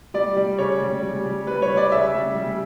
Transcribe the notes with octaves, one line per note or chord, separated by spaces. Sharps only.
G3 D5
G3
C#3 C#5
G3
G3
G3
G3 B4
C#5
G3
D5
C#3 E5
G3
G3